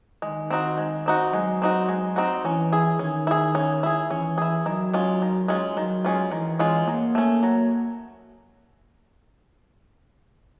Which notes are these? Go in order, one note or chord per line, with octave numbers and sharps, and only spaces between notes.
D#3 G#3
C4 D#4 F#4
G#3
C4 D#4 F#4
F#3 G#3
C4 D#4 F#4
G#3
C4 D#4 F#4
E3 C#4
E4 G#4
D#3 C#4
E4 G#4
C#4
E4 G#4
E3 C#4
E4 G#4
D#3 F#3
G#3 C#4 F4
D#3
G#3 C#4 F4
D#3 F#3
G#3 C#4 F4
D#3 E3
G#3 C#4 F4
F#3 A#3
A3 C#4
F#3